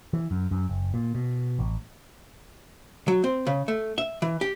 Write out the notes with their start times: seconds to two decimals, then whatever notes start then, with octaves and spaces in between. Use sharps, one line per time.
0.13 E3
0.31 F#2
0.51 F#2
0.69 F#1
0.94 A#2
1.15 B2
1.59 A1
3.08 F#3
3.24 C4
3.46 C#3
3.68 A3
3.98 E5
4.22 E3
4.41 G4